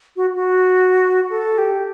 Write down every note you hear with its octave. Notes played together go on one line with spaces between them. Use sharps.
F#4
F#4
A4
G4